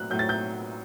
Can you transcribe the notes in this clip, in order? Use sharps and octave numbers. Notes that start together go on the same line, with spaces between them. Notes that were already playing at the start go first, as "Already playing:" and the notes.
Already playing: A2 F#3 F#6
A2 F#3 G6
A6
G6